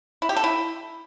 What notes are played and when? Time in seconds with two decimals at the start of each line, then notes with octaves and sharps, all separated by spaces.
0.22 E4
0.29 G4
0.36 A4
0.44 E4